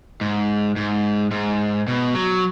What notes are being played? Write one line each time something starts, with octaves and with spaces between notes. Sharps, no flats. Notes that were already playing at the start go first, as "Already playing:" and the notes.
G#2
G#2
G#2
B2
F#3